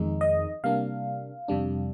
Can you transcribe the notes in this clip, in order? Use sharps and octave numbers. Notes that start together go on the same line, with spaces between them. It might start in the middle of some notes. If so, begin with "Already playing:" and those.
Already playing: F2 D#3 G#3 D#4
D#5
C3 G3 A#3 D4 F5
F2 C3 G3 D4